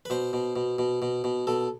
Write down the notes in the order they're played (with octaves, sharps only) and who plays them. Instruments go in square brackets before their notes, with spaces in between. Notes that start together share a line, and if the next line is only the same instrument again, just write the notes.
[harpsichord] B4
B2 C5
B2
B2
B2
B2
B2
B2 A4